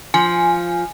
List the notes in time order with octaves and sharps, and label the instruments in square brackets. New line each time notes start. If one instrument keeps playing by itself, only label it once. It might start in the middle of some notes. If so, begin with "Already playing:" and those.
[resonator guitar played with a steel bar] F3 [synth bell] G#5